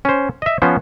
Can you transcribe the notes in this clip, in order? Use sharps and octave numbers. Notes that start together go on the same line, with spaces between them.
C#4 C5
D#5 E5
F3 B3 C#4 C5